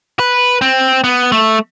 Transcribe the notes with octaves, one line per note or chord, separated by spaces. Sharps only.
B4
C4
B3
A3